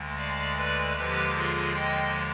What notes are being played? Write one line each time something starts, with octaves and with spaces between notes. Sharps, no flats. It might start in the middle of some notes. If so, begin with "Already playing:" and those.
Already playing: D2 D3 G#3
D5 F5
B4 D5
D#2 D3 F3 G#3 G4 B4
F4 G#4
D#5 G5